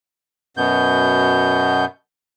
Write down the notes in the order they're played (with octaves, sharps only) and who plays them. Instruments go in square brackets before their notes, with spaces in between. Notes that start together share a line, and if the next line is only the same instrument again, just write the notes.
[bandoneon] F#2 B2 B3 G6